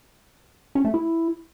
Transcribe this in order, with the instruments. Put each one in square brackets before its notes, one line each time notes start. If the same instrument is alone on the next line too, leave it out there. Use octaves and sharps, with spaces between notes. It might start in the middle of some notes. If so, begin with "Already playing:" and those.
[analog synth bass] C#4
A3
E4